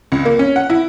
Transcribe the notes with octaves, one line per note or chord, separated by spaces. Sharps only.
C#2
A#3
C#4
F#5
E4